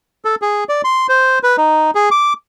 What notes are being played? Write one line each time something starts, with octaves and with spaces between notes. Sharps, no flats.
A4
G#4
D5
C6
C5
B4
D#4
G#4
D6